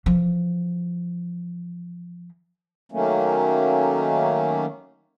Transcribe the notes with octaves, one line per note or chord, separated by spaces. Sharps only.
E3 F3
D#3 F#3 A3 A#3 C#4